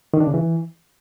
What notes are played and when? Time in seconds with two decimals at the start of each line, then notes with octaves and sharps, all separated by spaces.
0.14 D#3
0.20 D4
0.27 C#3
0.34 E3